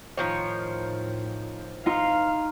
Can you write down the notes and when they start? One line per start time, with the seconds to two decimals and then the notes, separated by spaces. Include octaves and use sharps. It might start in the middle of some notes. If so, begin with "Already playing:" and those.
0.17 A2 D#3 F3 C#5
1.86 D#4 F4 F5